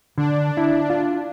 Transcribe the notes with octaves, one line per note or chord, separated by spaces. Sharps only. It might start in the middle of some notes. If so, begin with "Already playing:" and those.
D3 D4
E4
F4